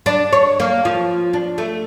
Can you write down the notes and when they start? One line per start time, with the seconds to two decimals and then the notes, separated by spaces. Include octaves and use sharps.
0.06 D4
0.33 C#5
0.60 A#3
0.85 F3
1.33 D4
1.58 A3